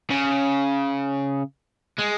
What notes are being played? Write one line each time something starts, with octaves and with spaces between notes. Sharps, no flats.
C#3
G#3